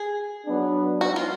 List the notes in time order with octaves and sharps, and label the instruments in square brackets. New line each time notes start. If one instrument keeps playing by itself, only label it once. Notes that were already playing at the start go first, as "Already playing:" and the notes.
Already playing: [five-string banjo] G#4
[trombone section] F#3 B3 D4
[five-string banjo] F#4
F4